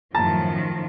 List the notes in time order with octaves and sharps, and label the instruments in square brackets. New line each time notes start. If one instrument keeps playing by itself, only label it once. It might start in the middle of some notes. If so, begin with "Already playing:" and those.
[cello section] F#2 A2 [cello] D#3 F3 [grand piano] A5 A6 [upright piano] A#5